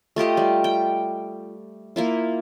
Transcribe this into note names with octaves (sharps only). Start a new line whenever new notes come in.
A3 F4 G4 D#5
G3
G5
A#3 E4 F4